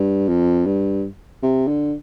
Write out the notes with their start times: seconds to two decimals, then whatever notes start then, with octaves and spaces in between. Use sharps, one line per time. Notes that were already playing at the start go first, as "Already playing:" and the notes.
Already playing: G2
0.28 F2
0.66 G2
1.42 C3
1.67 D3